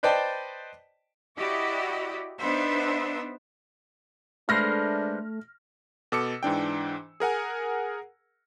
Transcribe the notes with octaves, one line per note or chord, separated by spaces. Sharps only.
B4 C5 D5 D#5 G5 A5
E4 F#4 G4 D5 D#5
B3 D4 D#4 C5 E5
G#3 A3 D4 B4 C5 F6 A#6
B2 A4 D6 E6 C#7
G#2 E3 D4 G5
G#4 A#4 F#5 G#5